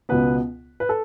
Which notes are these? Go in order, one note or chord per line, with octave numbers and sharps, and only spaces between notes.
C#2 B2 B3 B4
B4
A4